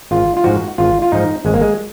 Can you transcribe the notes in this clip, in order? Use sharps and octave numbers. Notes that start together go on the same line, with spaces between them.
G#1 F4
F4
G#2 F3 F#4
G#1 F4
F4
G#2 F3 D#4
G#1 G#3
A#3
G#3